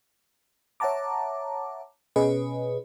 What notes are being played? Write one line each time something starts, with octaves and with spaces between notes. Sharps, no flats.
C#5 E5 F#5 A5 A#5 D6
B2 C#4 G#4 B4 D#5